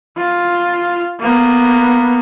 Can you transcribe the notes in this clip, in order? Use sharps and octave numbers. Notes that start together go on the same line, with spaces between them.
F4
A#3 B3